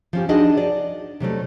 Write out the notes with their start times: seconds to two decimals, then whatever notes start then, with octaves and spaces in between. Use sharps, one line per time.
0.13 F3 C#4 G4
0.29 D4 D#4 F#4 G#4 D#5
0.58 D5
1.20 C3 F#3 G3 A3